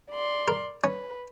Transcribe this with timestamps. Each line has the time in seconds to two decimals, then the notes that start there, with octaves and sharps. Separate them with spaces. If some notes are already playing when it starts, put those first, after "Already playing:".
0.11 D5 C6
0.48 A#4
0.84 C#4 B4